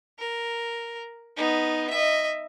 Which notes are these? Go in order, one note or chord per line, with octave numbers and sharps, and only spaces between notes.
A#4
B3 D#4
D#5 E5